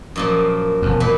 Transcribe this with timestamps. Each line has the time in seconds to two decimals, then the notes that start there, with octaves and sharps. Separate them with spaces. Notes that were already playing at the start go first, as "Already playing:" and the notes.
0.16 F#2 A#2 F3
0.82 E1 F2
1.00 A#2 B4